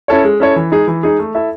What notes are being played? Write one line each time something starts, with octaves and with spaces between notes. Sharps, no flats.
C#4 E4 A4 C#5
G#3
C#4 E4 A4 C#5
E3
G#3 D#4 G#4
E3
G#3 D#4 G#4
A3
E4 A4 E5